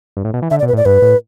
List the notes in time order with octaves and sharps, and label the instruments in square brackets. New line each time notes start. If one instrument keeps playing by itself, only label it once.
[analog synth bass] G2
A2
B2
E3
[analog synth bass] D3 [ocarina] E5
[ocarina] D5
[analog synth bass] B2
[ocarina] B4
[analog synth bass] A2
[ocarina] D5
[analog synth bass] G2 [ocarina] B4
[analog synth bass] A2